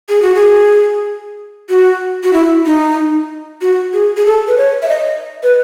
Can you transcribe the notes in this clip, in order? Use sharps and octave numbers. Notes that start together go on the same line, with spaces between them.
G#4
F#4
G#4
F#4
F#4
E4
D#4
F#4
G#4
G#4
A4
B4
C#5
E5
D#5
B4